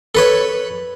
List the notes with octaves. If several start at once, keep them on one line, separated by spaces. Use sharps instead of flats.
A4 B4 C#5